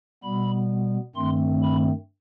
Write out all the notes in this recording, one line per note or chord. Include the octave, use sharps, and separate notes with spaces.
B2 G3 B3 B5
G2 D#3 A3 C4 C6
B5